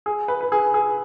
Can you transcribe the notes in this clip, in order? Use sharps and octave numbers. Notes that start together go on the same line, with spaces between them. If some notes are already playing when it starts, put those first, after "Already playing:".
G#4
B4
B4
G#4
G#4